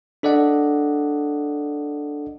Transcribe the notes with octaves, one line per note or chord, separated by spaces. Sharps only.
D4 A4 D5 D#5 F#5